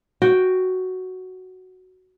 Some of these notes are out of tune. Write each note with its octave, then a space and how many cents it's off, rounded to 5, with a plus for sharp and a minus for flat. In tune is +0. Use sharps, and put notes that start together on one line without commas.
F#4 +5 G5 +0